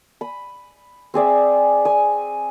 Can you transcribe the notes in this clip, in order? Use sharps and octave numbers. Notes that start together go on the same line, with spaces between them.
B5 D#6
C4 G#4 D5 E5
G#5 D#6